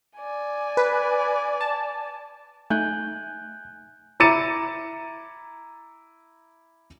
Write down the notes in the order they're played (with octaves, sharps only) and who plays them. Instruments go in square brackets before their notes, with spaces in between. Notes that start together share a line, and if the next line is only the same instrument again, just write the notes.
[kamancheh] D5 G#5
[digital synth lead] B4
A5
[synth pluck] A3 D#4 E5 [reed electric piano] G#5 F#6 G6
[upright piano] E4 A#5 D6 A6 C#7 D#7